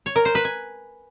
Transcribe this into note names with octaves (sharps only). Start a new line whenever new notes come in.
C#5
A#4
C5
B4
G#5